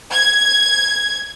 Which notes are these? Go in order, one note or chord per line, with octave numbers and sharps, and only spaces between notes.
G#6